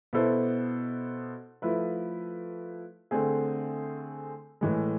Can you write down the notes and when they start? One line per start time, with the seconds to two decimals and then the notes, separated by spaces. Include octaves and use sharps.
0.13 B2 B3 E4 A4 C5
1.62 F3 A3 E4 B4
3.11 D3 A3 C4 G#4
4.61 A2 E3 G#3